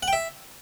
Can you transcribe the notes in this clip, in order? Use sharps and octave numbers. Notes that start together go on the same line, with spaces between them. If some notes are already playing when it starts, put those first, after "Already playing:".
F#5
G5
E5